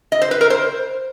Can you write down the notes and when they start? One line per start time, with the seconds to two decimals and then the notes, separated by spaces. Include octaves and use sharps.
0.12 D#5
0.22 C5
0.31 B4
0.41 A#4
0.50 C5